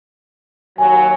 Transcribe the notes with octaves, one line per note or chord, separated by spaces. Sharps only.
D#2 F#3 G#5